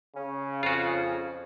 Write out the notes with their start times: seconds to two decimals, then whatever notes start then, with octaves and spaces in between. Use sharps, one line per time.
0.16 C#3 C#4
0.63 F2 F4 F#4